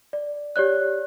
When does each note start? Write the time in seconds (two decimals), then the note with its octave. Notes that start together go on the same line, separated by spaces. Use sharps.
0.13 D5
0.56 G4 C#5 D5 F#6